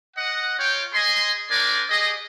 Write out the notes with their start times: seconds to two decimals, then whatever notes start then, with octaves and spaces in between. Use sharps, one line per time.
0.17 D#5 F#5
0.59 F4 C#5 G5
0.94 G#4 D#5 G#5 C6
1.51 D4 A#4 C5 D5 G#5
1.90 G4 G#4 D#5